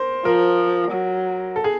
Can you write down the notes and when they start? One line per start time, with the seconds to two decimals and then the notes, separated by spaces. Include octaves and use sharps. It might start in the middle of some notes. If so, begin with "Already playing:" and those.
Already playing: A#4 C5
0.25 F3 A#4
0.91 F#3
1.56 A4
1.64 G#4